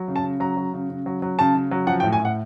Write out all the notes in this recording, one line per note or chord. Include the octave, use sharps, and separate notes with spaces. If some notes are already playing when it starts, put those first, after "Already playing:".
Already playing: F#3
C#3
A5
C#3
F#3 A#5
F#3
C#3
C#3
F#3
F#3
C#3 A5
C#3
F#3
F3 F#5
G5
A2
G#5
A2
F#5